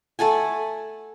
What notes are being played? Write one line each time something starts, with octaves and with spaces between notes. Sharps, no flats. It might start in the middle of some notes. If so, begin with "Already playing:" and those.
A3 A4 F#5 G#5